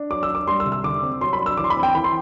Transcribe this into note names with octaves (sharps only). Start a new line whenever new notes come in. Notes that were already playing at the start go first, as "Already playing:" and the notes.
Already playing: D4
F#3 D6
E6
D4
D6
G3 C6
E6
C3
E6
D3 D6
C4
F#3 C6
B5
D4
E6
E3 D6
C6
B5
C4
G5
E3 B5
C6